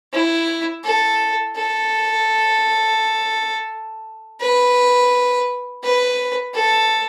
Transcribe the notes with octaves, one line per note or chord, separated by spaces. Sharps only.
E4
A4
A4
B4
B4
A4